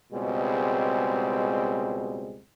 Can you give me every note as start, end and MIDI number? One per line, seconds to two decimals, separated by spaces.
0.13 2.40 37
0.13 2.40 47
0.13 2.40 55
0.13 2.40 56
0.13 2.40 60